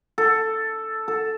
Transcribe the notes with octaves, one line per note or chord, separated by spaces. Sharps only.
A4
A4